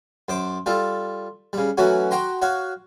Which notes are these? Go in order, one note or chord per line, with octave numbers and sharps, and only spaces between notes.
F#2 C5 D6
G3 F4 A4
C#3 G3
E3 F#3 A3 C#4 F#4
F#4 G5 A#5 C6
F#4 C#5 F5